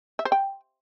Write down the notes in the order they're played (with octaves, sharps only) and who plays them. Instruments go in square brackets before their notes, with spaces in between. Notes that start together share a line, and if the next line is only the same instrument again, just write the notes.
[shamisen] E5
C5
G5